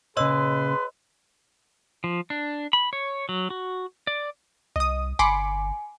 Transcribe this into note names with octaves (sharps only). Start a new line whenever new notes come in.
A#2 C#3 G#4 B4 C#5 D#5 C6 E6
F3
D4
B5
C#5
F#3
F#4
D5
C2 D#5 D#6
G1 G#5 B5 C6 D6